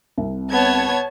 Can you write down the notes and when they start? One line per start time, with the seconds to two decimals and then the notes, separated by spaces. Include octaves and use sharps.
0.18 C2 C3
0.52 B3 C#5 A5 G#6